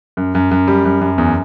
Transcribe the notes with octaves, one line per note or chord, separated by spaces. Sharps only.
F#2
F#2
F#2
G3
F#2
F#2
E2